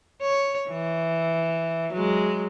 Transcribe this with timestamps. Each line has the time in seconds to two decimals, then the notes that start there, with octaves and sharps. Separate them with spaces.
0.22 C#5
0.69 E3
1.93 F#3 G#3